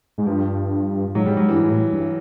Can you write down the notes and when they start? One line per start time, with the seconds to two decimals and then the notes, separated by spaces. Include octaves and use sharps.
0.18 G#2
0.26 G2 F3
1.15 G#2 F#3
1.26 G#2 G3
1.37 G#2 F#3
1.49 G2 E3
1.59 G#2
1.70 A2
1.92 G2